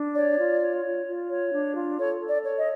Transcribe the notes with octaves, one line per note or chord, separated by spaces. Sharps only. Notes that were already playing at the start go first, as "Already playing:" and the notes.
Already playing: D4
C#5 D5
F4
C#5
F4
F4
C#5
D4
F4
A4 C#5
A4
D5
C#5
D#5